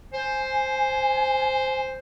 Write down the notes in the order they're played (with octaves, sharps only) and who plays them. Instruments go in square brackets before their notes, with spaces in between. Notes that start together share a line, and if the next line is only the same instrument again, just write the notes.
[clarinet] C5 [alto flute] G#5